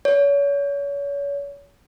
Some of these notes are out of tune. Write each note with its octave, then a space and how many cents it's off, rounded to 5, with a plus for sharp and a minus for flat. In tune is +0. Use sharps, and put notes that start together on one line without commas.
C#5 +35